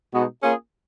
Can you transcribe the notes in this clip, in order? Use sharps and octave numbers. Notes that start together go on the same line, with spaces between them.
B2 G#3 B3 D#4 F#4
A#3 C#4 F4 G#4